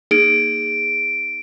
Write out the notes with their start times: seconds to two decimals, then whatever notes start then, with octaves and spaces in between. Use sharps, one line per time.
0.11 A#3 D#4 G#4 D7